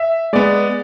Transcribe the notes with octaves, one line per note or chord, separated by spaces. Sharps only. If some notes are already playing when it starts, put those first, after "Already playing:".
Already playing: E5
G#3 B3 D5